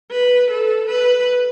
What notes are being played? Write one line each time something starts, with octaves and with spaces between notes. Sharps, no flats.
B4
A4
B4